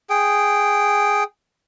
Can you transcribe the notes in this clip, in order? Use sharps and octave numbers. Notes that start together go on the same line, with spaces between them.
G#4 G5